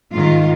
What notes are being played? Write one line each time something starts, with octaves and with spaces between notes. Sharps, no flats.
G#2 D#3 F4